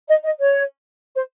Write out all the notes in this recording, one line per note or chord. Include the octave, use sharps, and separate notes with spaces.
D#5
D#5
C#5
C5